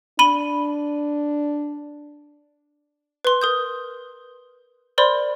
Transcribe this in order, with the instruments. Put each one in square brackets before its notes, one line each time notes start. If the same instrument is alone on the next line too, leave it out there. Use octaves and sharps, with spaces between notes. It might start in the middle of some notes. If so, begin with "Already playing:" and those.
[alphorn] D4 [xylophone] B5 D#7 G7
[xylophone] B4 C6
A#4 D#6 G6
A#4 C5 D5 B5 C6